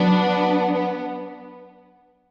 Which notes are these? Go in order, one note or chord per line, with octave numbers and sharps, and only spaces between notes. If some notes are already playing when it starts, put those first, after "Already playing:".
Already playing: F#3 B3 D4
B3